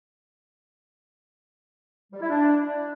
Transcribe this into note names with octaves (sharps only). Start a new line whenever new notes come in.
G3
E4
D4